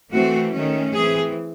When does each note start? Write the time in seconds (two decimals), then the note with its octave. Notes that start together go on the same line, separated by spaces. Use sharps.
0.12 E3 A3 C4 F#4
0.53 D#3 A3 C#4
0.93 E3 C4 G#4